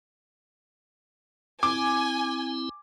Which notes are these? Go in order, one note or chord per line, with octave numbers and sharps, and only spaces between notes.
C4 E4 G#5 D6